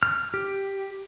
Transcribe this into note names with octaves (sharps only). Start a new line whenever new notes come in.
F6
G4